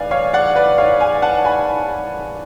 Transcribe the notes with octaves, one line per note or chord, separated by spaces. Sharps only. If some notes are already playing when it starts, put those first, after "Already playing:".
Already playing: A1 B4 D5 F5 G#5
C#5 F5
D5 F#5
B4 D5
C#5 F5
F5 G#5
F#5 A5
G#5 B5